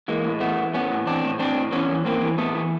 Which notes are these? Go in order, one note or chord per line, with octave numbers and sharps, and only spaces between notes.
E3 G#3 A#3
A2
E3 A3 B3
E3
A2 B3 C#4
A2
E3 C4 D4
A2
A2 C4 D4
A2
E3 B3 C#4
E3
A2 A#3 C4
E3
A2 A3 B3
E3